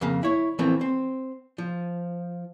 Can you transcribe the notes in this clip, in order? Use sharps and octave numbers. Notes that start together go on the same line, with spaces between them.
F2 C#3 A#3 F5
E4 C#5
E3 F3 A3 A#3 C4
C4
F3